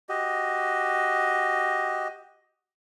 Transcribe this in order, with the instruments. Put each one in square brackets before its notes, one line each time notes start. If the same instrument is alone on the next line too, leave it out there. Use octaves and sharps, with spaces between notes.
[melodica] F#4 G4 D#5